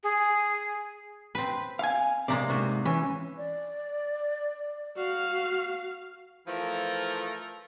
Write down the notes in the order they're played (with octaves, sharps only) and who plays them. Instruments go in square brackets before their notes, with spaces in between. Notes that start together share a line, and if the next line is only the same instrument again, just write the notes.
[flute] G#4
[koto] C4 B4
[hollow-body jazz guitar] F5 G#5
[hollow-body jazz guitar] C3 [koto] G#3 A#3 D5
[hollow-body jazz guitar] G#2 C3 [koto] F#4
[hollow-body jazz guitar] E3 [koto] C#4
[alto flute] D5
[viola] F#4 F5
[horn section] E3 F3 A3 A4 A#4